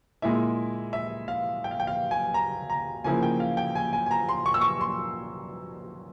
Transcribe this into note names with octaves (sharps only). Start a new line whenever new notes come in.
A#2 G#3 E4 E5
E5
F5
G5
F5
G5
F5
G#5
A#5
A#5
C#3 F3 A#3 E4 G#5
G5
F5
G5
G#5
G#5
G#5
A#5
C6
C#6
E6
C#6
C6